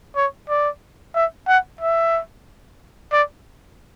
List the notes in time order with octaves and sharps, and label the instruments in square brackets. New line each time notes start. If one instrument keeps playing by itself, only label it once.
[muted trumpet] C#5
D5
E5
F#5
E5
D5